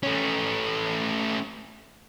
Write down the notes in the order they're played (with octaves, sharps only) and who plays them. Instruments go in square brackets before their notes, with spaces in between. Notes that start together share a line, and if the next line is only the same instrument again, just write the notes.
[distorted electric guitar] A3 C#4